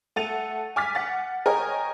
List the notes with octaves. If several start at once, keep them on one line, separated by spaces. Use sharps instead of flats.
A3 F#5 A6 D#7 F7
G#5 D6 F6 A6 B6
F#5 A6
A#4 C#5 D#5 G5 G#5